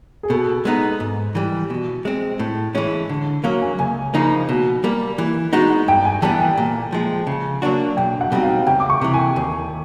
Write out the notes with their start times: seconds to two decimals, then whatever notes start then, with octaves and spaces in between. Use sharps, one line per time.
0.23 G#4
0.30 B2 A4
0.65 G#3 B3 D#4
1.00 G#2
1.35 E3 G3
1.70 B2
2.05 G#3 C4
2.39 A2
2.75 E3 G#3 C#4
3.09 D3
3.43 F#3 A#3 C#4 F5
3.62 G#5
3.79 C#2 G#5
4.14 C#3 F3 A#3 D#4
4.49 B2
4.84 G3 A#3
5.18 E3
5.53 G#3 B3 D#4 F#4
5.88 G2 G5
6.05 G#5
6.22 E3 G3 B3 A5
6.40 G#5
6.58 A#2
6.92 F3 G#3
7.27 C#3
7.62 F#3 A#3 D4 F#4
7.97 B1 G5
8.21 F#5
8.32 B2 G3 C4 D#4
8.43 F5
8.67 C#2 G5
8.80 D6
8.90 C#6
9.01 C3 E3
9.14 G#5
9.36 D#2